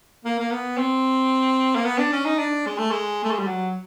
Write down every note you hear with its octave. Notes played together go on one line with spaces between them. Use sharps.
A#3
A#3
B3
C4
A#3
B3
D4
C#4
D#4
D4
G#3
A3
G#3
A3
G#3
G3
F#3